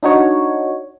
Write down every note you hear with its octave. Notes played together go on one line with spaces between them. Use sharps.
D4 D#4 F#4 C#5